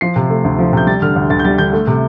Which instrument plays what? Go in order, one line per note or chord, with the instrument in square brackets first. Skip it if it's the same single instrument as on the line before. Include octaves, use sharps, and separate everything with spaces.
[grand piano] F3 C7
C3
A3
D2
F3
C3 G6
G3 A6
D3 F6
D2
D2 A6
G6
G3 A6
D3 G6
A3
C3